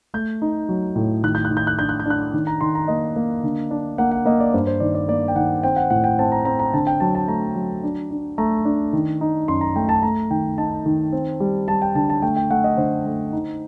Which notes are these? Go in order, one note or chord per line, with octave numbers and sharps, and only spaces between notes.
A3 G6
D#4
F#3
A2
D#3 F#6
G6
F#6
D#3
G6
F#6
D4 G6
F#6
G6
D4 F#6
D#3
A#5
D#3 C6
A#5
A#3 D#5
A#3
D3
D4
A#3 F#5
F#5
A#3 D#5
D5
G2 C5
C5
D#3 D5
D5
A#3 D5
G5
D#3 F#5
C4 G5
F#5
A2 F#5
G5
C4 A5
A#5
C4 A#5
A#5
D3 A5
G5
F#3 A5
A5
A3 A#5
F#3
D4
D4
A3 A#5
D4
D#3
D#4
F#2 C6
A#5
A3 G5
A5
A3 A#5
D#3 G5
D#4 A5
D#3
C4
G3
G3 A5
G5
D3 A5
A5
A3 G5
G5
A3 F#5
D#5
D3 C5
A3
D#4